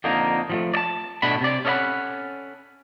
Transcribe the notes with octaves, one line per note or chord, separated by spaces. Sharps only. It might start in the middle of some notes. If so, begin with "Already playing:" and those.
F2 D3 A#3 D#4
F3 F#3 A3
D5 A5
B2 A3 D4 B5
C3 D5
C#4 A4 C#5 D#5 F#5 B5